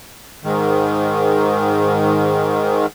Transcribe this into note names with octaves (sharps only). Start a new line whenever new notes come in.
G#2 D#3